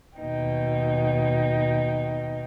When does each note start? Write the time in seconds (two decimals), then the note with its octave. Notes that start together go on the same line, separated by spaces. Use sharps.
0.18 D#2 B2 D#4 G5